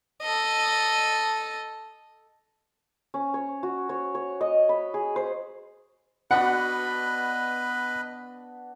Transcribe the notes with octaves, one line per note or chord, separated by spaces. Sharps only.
A4 D#5
C#4
C#5
F#4
C#5
C#5
D#5
B5
G#4
C5
B3 D4 F#4 B4 D#5 F#5 B5